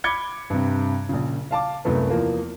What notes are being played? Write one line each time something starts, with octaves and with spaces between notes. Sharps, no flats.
B5 D6 G#6 C#7 G7
G2 C3
A#1 C#3
F5 A5 D6
C2 F#2 A3 B3
E2 F3 A#3